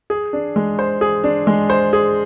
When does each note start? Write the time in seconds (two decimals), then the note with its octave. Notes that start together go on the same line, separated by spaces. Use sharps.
0.10 G#4
0.33 D4
0.56 G#3
0.79 C5
1.01 G#4
1.24 D4
1.47 G#3
1.70 C5
1.93 G#4